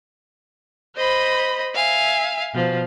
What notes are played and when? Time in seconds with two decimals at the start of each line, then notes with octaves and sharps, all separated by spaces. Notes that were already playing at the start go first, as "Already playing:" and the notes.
0.95 C5 D#5 B5
1.74 E5 F5 G#5
2.52 B2 F3